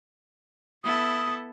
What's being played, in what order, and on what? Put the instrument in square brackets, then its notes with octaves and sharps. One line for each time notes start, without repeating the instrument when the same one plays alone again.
[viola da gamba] B3 E4 A4 [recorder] D#6